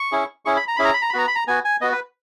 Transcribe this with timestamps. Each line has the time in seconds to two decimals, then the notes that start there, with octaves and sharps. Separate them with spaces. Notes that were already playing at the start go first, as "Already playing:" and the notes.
Already playing: C#6
0.12 C#4 E4 G#4
0.45 C#4 E4 G#4 C#6
0.57 B5
0.68 A#5
0.76 C#4 E4 G#4 B5
0.85 A#5
0.94 B5
1.02 A#5
1.10 B5
1.13 B3 F#4 A#5
1.27 B5
1.35 A#5
1.47 B3 F#4 G#5
1.65 G#5
1.81 B3 F#4 D#5
1.92 B4